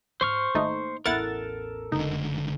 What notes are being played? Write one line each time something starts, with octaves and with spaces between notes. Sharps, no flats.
G#2 C5 C#6 F6
G#1 A3 A#3 D#4
A1 E2 E4 A4 A#4 F#5 A6
F1 C#2 F#2 D3 D#4